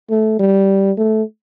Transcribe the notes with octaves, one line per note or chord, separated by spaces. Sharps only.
A3
G3
A3